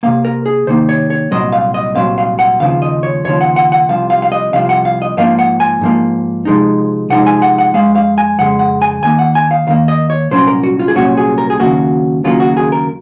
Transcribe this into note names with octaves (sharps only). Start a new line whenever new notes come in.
C3 D#3 A#3 F5
A#4
G#4
C3 D#3 A#3 C5
C#5
C#5
C2 A#2 F#3 C4 D#5
F5
D#5
C2 A#2 F#3 C4 F5
F5
F#5
D#2 C#3 F3 F5
D#5
C#5
D#2 C#3 F3 C#5
F#5
F#5
F#5
C2 C3 F3 F5
F5
F5
D#5
C2 C3 F3 F5
F#5
F5
D#5
G#2 F3 A#3 F5
F#5
G#5
G#2 F3 A#3
C3 F3 G#3 D#4
C3 F3 G#3 D#4 F#5
G#5
F#5
F#5
F2 C#3 G#3 F5
F5
G#5
F2 C#3 G#3 F#5
F#5
G#5
D#2 D#3 A#3 G#5
F#5
G#5
F5
D#2 D#3 A#3 F5
D#5
C#5
C2 A#2 F#3 C#4 C5
A#4
F#4
F4
G#4
C2 A#2 F#3 C#4 F#4
G#4
A#4
G#4
D#2 C#3 F#3 A#3 F#4
D#2 C#3 F#3 A#3 F4
F#4
G#4
A#4